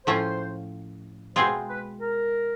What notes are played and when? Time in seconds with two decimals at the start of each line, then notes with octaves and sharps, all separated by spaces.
0.06 A2 F3 A3 C#4 F4 C5
1.36 B2 G#3 C4 F4 G#4 C5
1.69 B4
2.01 A#4